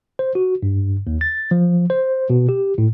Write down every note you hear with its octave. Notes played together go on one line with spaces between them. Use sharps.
C5
F#4
G2
D#2
A6
F3
C5
B2
G4
A2